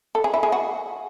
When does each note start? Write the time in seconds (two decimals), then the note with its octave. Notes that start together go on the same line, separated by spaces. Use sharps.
0.15 A4
0.24 G#4
0.34 E4
0.43 G#4
0.52 F#4